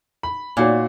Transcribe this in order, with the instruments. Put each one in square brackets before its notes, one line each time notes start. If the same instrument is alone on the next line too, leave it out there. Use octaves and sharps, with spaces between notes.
[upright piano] B5
[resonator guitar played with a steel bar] A#2 [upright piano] D#4 F#4 C#5